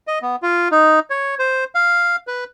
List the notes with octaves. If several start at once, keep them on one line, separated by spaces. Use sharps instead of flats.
D#5
B3
F4
D#4
C#5
C5
F5
B4